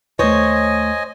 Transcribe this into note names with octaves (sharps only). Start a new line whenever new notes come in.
D#2 A3 C5 C#5 D#5 G#5